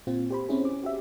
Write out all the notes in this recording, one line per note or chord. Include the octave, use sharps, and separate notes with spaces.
A#2 C4 F4
G4 C5 B5
C4 C#4 E4 G#4
D6
F#4 G4 E5